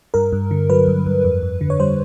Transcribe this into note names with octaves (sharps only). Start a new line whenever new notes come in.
G2 A#4
G2
D3
F#3 B4
G2
G2
F2
F2
D3
C#5
G3 C5